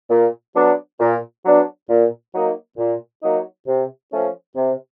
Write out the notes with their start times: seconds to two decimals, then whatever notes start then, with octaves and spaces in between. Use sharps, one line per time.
0.10 A#2
0.55 F#3 B3 D4
1.00 A#2
1.44 F#3 B3 D4
1.89 A#2
2.33 F#3 A#3 D#4
2.78 A#2
3.22 F#3 A#3 D#4
3.67 C3
4.12 F3 A3 C#4
4.55 C3